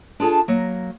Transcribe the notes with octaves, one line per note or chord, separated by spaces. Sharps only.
D4 F4 G#4 A4 A5
F#3 A#3